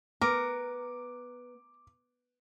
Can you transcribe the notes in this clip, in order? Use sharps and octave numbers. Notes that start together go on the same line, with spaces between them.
B3 A#4 D6